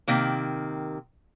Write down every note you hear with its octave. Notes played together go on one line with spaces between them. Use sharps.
C3 D#3 A#3